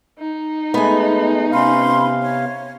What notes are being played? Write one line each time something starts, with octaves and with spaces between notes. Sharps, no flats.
D#4
G#3 A3 B3 G#5
C3 C#4 F5 B5 C6
C#5